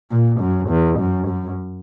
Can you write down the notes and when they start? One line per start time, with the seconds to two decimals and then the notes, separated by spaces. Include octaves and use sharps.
0.11 A#2
0.40 F#2
0.69 E2
0.99 F#2
1.27 F#2